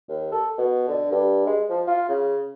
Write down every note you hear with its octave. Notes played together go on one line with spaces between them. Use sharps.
D#2
A4
B2
D3
G2
G#3
F3
F4
C#3